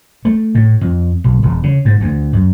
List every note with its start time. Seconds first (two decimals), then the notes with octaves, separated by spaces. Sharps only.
0.25 A3
0.55 A2
0.81 F2
1.24 B1
1.43 E1
1.63 C#3
1.85 G#2
2.00 D2
2.33 F#2